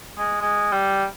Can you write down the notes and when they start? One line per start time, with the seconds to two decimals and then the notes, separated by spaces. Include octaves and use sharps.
0.18 G#3
0.42 G#3
0.72 G3